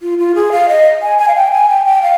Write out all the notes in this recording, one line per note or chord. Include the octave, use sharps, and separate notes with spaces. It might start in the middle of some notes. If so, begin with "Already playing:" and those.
F4
F4
G#4
F5
D#5
G#5
G#5
F5
G5
G#5
G5
G5
F5